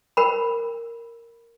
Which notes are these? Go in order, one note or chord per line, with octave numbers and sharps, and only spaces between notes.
A#4 B5